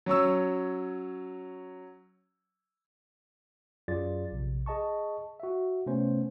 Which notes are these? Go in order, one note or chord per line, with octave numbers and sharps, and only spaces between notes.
F#3 C#4 C#6 E6
F#2 F#3 F4 G#4 D5 A6
A#1 C3
G#4 D#5 A5 C#6
F#4 E5
C3 A3 B3 C#4 C5